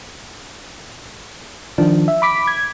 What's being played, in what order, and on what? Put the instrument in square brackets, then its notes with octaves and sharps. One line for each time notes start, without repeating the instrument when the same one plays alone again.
[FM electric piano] D#3 F3 D4
E5
B5 D6 B6
G#6